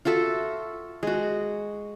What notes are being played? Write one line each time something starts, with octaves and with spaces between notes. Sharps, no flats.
F4 F#4 A4 E5
G#3 F#4